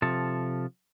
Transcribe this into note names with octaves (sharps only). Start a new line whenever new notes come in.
C3 F3 A4